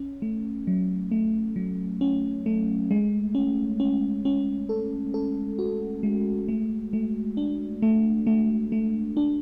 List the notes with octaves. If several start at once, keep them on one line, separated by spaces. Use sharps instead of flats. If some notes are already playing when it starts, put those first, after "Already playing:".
Already playing: C#4
A3
F#3
A3
F#3
C#4
A3
G#3
C#4
C#4
C#4
A4
A4
F#4
G#3
A3
A3
D4
A3
A3
A3
D4